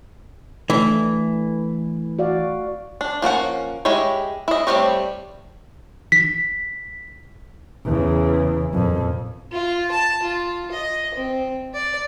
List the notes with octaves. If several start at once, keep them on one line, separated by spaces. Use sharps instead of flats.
E3 A3 D4 E4
F#4 D5 F5
D4
F3 A#3 C#4 F#5
G#3 E4 G4 C#5
E4 D#5
G3 A3 C4 G4 C#5
B6
E2 C#3
F2 A#2
F4
A5
F4
D#5
C4
D5